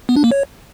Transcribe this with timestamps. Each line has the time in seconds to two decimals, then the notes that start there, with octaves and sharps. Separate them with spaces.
0.09 B3
0.16 D4
0.24 A#3
0.31 C#5